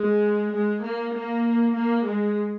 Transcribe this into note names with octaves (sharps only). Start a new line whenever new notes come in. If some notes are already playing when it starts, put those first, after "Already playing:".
Already playing: G#3
G#3
A#3
A#3
A#3
G#3